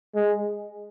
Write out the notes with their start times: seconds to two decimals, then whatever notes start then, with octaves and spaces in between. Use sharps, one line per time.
0.15 G#3